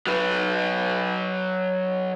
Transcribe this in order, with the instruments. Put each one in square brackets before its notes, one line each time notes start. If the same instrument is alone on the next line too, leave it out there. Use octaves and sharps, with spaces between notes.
[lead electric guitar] F#3 B4